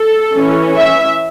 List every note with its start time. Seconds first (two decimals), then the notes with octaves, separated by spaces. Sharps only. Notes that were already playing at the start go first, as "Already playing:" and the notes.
Already playing: A4
0.35 E3 C#4
0.78 E5